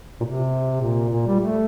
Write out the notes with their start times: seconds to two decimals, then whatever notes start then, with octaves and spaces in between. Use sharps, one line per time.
0.20 A#2
0.24 C3
0.81 A#2
1.09 A#2
1.27 G3
1.39 A3